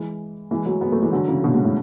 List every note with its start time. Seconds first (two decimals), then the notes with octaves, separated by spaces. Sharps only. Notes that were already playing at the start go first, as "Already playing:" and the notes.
Already playing: E3 G#3
0.51 E3 G#3
0.66 F#3 A3
0.81 G#3 B3
0.92 F#3 A3
1.02 E3 G#3
1.12 D3 F#3
1.28 C#3 E3
1.43 B2 D3
1.54 G#2 B2
1.64 A2